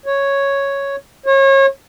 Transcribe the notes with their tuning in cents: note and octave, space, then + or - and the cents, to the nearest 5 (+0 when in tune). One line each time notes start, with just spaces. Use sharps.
C#5 +0
C#5 -30